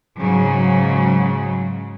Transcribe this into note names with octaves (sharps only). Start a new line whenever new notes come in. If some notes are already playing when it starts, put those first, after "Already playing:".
G#2 C#3 F#3